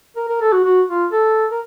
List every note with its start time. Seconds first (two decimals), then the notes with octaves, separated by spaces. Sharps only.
0.16 A#4
0.29 A#4
0.41 A4
0.52 F#4
0.64 F#4
0.88 F4
1.12 A4
1.51 A#4